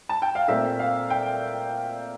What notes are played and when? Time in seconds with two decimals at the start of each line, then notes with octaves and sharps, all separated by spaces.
0.09 A5
0.22 G5
0.35 F5
0.48 A#2 A3 C4 E5
0.79 F5
1.10 G5